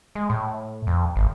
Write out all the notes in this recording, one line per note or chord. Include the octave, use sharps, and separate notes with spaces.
G#3
A2
F2
G#1